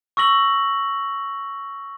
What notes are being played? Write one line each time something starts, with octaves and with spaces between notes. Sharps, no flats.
C#6 E6 A#6 F#7